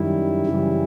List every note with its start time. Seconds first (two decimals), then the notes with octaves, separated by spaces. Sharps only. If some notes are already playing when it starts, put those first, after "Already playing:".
Already playing: F#2 D#3 G3 E4
0.47 F#2 C#3 E3 G3